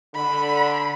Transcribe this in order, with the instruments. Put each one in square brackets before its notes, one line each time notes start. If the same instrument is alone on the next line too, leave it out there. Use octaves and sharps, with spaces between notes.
[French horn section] D3 [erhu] B5